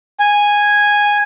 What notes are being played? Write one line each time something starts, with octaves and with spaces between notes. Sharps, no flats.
G#5